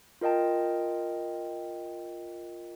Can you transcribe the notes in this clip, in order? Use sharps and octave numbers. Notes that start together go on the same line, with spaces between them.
F4 A#4 D#5 G5 A5